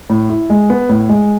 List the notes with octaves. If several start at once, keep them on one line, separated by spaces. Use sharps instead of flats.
A2
E4
G#3
B3
A2
G#3